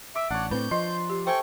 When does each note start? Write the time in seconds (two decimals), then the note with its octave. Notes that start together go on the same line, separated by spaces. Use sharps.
0.16 E5 D6
0.30 A1 D4 C#5 F#5
0.51 A2 A#3 C4 B4 B5 G6
0.71 F3 D#5 C6
1.10 G4
1.27 A3 C5 G5 G#5 C#6